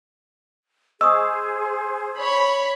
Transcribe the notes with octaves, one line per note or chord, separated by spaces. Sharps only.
G#4 C5 D#5 C#6 D#6 E6
C#5 B5